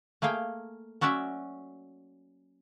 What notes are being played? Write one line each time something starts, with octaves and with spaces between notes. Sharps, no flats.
A3 A#3 G#4 F5 G5
F#3 C#4 F#4 D5 E5